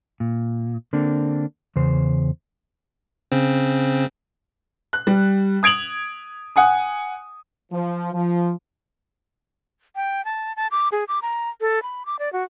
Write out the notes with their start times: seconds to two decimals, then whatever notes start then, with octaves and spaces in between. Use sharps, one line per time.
0.20 A#2
0.93 D3 A#3 C4 D4
1.76 E2 C#3 C5
3.32 C#3 C4
4.93 F#6
5.07 G3
5.63 D#6 G#6 D7 F7 F#7
6.56 F#5 G#5 D#6
7.72 F3
8.13 F3
9.96 G5
10.25 A5
10.56 A5
10.71 D6
10.92 G#4
11.08 D6
11.22 A#5
11.61 A4
11.83 B5
12.06 D6
12.19 D5
12.33 F#4